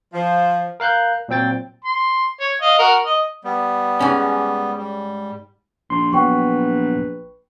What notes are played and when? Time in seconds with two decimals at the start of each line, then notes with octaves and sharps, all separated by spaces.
0.13 F3
0.80 A#4 F5 F#6 G6
1.29 A#2 F#3 C4 G5 A6
1.84 C6
2.40 C#5
2.61 D#5 F5
2.79 F#4 A#4
3.05 D#5
3.44 G3 B3
4.01 G#2 C#4
4.77 G3
5.90 A#1 C6
6.13 F#3 B3 B4 G5 C#6